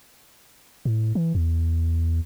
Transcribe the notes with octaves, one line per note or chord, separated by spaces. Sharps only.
A2
E3
E2